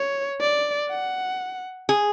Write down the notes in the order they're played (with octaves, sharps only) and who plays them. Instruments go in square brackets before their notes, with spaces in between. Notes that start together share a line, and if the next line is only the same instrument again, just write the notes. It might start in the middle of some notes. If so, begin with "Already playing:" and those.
Already playing: [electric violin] C#5
D5
F#5
[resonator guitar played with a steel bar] G#4